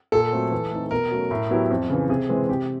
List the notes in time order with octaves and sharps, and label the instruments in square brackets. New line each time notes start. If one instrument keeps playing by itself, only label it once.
[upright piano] A#2 [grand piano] A4
[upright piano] F#3 A3 C4
E3
A3 C4 D#4
[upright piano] B2 [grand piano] A#4
[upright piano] F#3 A3 C#4
A2
F#3 B3 E4 G4
F2
C#3 E3
[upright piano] C3 [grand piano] G#4
[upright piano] E3 G#3 C4
[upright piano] C3 [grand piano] G4